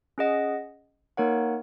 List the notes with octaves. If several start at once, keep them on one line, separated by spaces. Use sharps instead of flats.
C#4 G#4 D#5 F#5
A#3 D#4 A#4 C#5 F#5